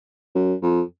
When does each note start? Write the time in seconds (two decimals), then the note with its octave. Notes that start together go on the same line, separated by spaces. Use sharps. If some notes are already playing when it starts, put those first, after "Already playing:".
0.35 F#2
0.62 F2